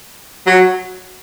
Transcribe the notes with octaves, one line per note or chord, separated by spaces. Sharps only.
F#3